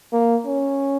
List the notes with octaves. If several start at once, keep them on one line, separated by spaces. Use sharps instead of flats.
A#3
C#4